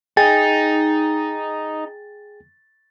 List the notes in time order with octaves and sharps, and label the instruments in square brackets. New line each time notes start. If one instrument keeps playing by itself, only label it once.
[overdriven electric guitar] D#4 [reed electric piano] G#4 G5 G#5 [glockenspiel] A6